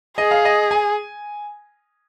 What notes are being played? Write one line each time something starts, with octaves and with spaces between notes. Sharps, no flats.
G#4 D#5
F5
D#5
G#5